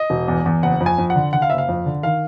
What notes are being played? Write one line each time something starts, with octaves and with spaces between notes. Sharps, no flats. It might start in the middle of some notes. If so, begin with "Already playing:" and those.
Already playing: D#5
E1
E2
E2
F#1 F#5
F2
G#5
F2
F#5
D3
D3 F#5
F5
F#1 E5
F5
F2
D3
D#3 F5